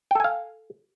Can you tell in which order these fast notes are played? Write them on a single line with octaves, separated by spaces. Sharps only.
G5 A4 G#5 F5